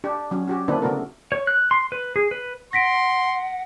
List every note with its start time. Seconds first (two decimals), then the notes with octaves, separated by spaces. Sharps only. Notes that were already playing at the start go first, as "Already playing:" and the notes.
0.04 D4 G4
0.31 F#3 C#4
0.47 C#4 F#4 G4
0.68 D3 A#3 C4 D4 E4 B4
0.82 C#3 A3 B3 F#4 A#4
1.32 C#5
1.47 F#6
1.71 C6
1.92 B4
2.16 G#4
2.31 B4
2.73 F#5 C6 A#6 B6 D7